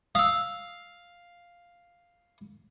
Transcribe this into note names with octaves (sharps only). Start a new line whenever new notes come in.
F5 D#6 E6